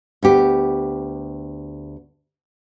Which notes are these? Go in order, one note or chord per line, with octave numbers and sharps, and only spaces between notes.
D2 B3 G4